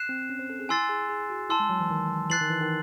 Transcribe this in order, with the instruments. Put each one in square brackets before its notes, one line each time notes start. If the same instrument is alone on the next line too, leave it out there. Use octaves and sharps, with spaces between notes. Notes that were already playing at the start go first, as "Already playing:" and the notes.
Already playing: [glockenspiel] F#6 C7 E7
[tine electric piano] C4
C#4
C5
A4
G#4
[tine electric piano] E4 [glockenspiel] G#5 C6 E6 A6 C7
[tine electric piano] G#4
G#4
F#4
[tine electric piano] E4 [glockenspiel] A5 C6 E6
[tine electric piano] G#3
F#3
E3
D#3
[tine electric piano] E3 [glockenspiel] F#6 A6 C7 F#7
[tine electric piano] D#3
E3
D#3